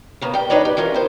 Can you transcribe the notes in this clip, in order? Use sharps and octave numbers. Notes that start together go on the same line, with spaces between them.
C#3 A#3 B3
G3 G5
D4 D#4 B4 C#5 D5
G4
E3 C#4 F4 A#4
B3 C5